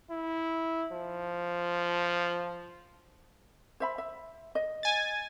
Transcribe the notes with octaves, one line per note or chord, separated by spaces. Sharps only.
E4
F3
C5 E5 B5
E5
D#5
G#5 A6